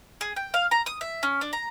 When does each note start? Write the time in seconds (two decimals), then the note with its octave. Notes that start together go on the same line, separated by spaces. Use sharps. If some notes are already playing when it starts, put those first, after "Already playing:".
0.21 G#4
0.36 G5
0.54 F5
0.71 A#5
0.86 D#6
1.01 E5
1.23 C#4
1.41 D4
1.53 A#5